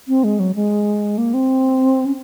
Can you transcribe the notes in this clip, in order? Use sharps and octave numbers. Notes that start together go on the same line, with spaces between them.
C4
G#3
F#3
G#3
A#3
C4
C#4